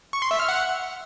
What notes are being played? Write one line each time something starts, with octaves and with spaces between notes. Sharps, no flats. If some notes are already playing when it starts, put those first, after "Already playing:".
C#6
C6
E5
F6
F#5